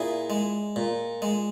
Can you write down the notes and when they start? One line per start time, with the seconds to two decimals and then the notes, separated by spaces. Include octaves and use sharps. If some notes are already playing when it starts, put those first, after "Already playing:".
Already playing: A#2 E4 G#4
0.30 G#3
0.76 A#2
1.22 G#3